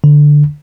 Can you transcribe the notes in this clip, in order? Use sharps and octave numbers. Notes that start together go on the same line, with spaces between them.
D3